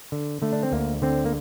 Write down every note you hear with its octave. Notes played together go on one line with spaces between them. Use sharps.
D3
D3 A3
D4
C4
D2 A#3
D3 C4
A#3